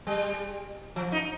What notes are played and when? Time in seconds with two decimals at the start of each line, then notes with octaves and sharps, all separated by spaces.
0.07 G3
0.96 F3
1.12 D#4